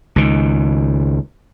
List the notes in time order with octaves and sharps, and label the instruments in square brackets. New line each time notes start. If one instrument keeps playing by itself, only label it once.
[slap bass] C#2 D#3